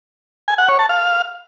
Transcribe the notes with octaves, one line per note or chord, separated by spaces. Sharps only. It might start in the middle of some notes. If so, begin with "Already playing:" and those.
G#5
F#5
C#5
A5
F5